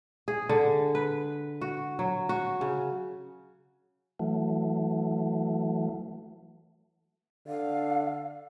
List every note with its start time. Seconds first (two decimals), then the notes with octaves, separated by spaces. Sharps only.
0.28 G#4
0.49 D3
0.95 B4
1.61 F#4
1.99 F#3
2.29 F#4
2.61 C#3
4.19 E3 F#3 A3
7.47 D3 F5